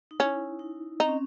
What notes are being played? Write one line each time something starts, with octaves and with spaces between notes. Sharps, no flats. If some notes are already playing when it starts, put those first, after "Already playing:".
D#4
C#4 E4
D#4
C4 D#4
C#4